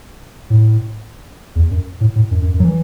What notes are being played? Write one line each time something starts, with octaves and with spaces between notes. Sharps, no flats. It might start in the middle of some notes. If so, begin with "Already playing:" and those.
A2
E2
F#2
A2
A2
F#2
F#2
F#2
F#3
E3